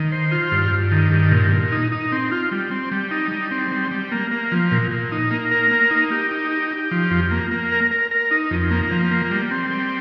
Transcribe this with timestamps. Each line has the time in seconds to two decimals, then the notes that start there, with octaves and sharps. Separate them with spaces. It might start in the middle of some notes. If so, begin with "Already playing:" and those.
Already playing: D#3
0.12 C5
0.31 F4
0.52 G2
0.72 G2
0.92 D#3
1.12 G2
1.32 A#2
1.51 A#2
1.72 D#4
1.92 D#4
2.12 C4
2.31 F4
2.52 G3
2.71 C4
2.92 G3
3.11 D#4
3.31 G3
3.51 C4
3.71 G3
3.91 G3
4.12 A#3
4.31 A#3
4.52 F3
4.71 A#2
4.91 A#2
5.12 D#4
5.31 A#3
5.51 A#4
5.71 A#3
5.91 D#4
6.11 G4
6.31 D#4
6.51 G4
6.71 G4
6.91 F3
7.11 F2
7.31 A#3
7.51 A#3
7.72 A#4
7.91 A#4
8.11 A#4
8.31 D#4
8.51 F2
8.71 A#3
8.91 F3
9.11 A#3
9.31 G3
9.51 C4
9.71 G3